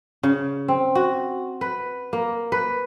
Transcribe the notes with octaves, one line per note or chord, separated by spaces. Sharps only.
C#3
C4
F#4
B4
A#3
B4